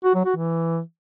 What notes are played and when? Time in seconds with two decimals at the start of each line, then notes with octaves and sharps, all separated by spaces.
0.04 F#4
0.15 F#3
0.25 F#4
0.36 E3